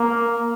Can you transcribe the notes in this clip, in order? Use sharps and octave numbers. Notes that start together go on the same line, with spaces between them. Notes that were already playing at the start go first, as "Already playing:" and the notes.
Already playing: A#3